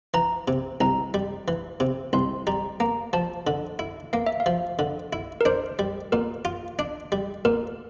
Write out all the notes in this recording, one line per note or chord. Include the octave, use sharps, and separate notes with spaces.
E3 A#5
C3
C2 A#5
G3
E3
C3
C2 C6
G3 A#5
A#3 A#5
F3 A5
D3
E4
A#3 F5
E5
F5
F3
D3
E4
A#4
D4 C5
G3
A#2 A#4
F4
D4
G3
A#2 A#4